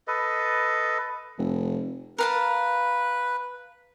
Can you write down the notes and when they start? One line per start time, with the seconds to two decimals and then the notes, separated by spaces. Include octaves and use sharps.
0.07 A4 B4 D#5
1.38 F1
2.18 A#4 B4 F5 A5